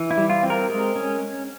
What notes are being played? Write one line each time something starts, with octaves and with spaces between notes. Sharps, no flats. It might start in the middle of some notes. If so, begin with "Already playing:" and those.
Already playing: E3
E4
G3
F4
C4
A#4
G#3
C#4